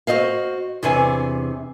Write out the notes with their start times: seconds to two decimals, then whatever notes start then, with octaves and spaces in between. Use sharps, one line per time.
0.07 F#4 A4 C5 D#5 F5
0.83 E2 C3 D4 C#5 G#5